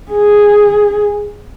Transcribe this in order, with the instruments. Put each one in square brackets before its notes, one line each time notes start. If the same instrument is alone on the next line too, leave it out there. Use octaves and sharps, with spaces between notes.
[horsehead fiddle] G#4